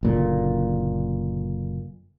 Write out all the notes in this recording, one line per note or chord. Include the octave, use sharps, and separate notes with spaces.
F#1 A#2 D3